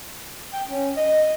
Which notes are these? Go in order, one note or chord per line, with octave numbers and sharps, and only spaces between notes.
G5
C#4
D#5